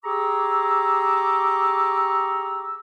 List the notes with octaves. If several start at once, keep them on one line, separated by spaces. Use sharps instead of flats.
G4 G#4 A#5 C#6 D6 E6